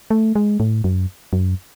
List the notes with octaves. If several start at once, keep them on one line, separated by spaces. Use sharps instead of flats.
A3
G#3
A2
F#2
F#2